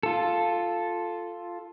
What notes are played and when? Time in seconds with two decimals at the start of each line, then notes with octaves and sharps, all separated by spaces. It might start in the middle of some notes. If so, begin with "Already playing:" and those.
0.03 F4 A4